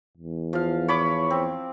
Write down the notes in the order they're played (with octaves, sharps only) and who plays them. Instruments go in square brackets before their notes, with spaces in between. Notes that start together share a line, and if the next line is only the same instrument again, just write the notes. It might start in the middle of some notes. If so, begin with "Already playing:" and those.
[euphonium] E2
[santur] F3 F5
C#5 B5 D6
C4